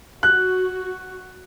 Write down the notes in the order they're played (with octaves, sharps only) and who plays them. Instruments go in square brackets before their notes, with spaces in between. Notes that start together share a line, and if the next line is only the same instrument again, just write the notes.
[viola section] F#4 [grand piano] F#6